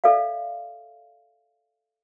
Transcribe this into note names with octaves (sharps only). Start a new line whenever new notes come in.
A4 D5 E5 F5